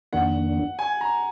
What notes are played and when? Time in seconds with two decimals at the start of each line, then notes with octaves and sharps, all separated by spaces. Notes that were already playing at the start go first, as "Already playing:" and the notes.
0.13 F2 D#3 A#3 D4 F#5
0.79 G#5
1.01 A#5